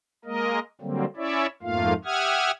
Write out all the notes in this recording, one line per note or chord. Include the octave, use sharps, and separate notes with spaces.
G#3 A#3 A#4 D#5
D3 F#3 G3 A#3 C4
C#4 E4 C#5 D5 E5
F2 G#2 A3 A#3 F4 F5
G4 E5 F#5 D#6 F6 G#6